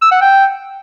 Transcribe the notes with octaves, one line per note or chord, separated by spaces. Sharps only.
E6
F#5
G5